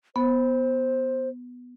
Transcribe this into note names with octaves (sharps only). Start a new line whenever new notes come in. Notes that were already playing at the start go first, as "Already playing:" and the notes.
B3 C5